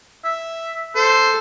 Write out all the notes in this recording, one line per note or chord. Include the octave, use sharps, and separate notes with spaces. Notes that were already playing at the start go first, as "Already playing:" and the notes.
E5
A4 C5